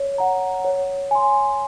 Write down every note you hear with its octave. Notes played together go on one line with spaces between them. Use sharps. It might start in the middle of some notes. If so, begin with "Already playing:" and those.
Already playing: C#5
F#5 A#5
C#5
G#5 C6